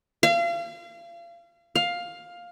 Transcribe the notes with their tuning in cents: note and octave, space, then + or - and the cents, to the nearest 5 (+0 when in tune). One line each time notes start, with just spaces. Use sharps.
F5 -35
F5 +10